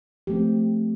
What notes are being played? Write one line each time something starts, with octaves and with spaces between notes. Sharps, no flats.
F3 A3 C4 G4